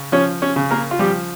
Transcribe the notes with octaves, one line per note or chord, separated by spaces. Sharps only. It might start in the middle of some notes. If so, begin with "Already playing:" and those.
Already playing: C#3
F3 C#4 C#5
C#4 C#5
C#3
A#3 A#4
F4
F3 G3 G4